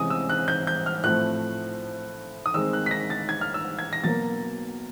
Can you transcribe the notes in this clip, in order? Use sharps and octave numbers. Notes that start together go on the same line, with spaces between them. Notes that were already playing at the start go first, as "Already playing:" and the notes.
Already playing: C3 E3 G#3 C#4 G#5 D#6
E6
F#6
G6
G6
F6
A2 F3 A3 C4 F#6
D#6
D#3 G#3 C4 E6
F#6
B6
A#6
A6
G#6
F6
E6
G#6
A#6
B2 F#3 A#3 A6